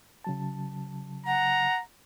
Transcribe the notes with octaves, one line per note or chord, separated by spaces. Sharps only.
C#3 F#3 A5
F#5 A#5